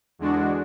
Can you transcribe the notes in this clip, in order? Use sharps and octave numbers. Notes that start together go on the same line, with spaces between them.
E2 D3 G#3 D4 F#4